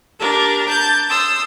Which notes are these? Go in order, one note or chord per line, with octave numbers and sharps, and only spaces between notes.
D4 G4 A#4
A5 G6
C6 D#6 E6